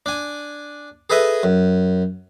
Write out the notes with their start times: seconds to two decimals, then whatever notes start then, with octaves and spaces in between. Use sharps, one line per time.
0.06 D4 G#5
1.10 G#4 A4 B4 D#5 E5
1.43 F#2